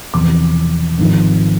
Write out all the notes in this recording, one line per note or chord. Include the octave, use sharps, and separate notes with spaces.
E1 E2 C3 F3 D6
G#1 G#2 F3